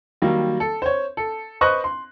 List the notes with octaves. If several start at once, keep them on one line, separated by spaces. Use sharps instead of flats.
D#3 F#3 G3 A#3
A4
C5 C#5
A4
B4 C5 D#5 C#6 F#6
C6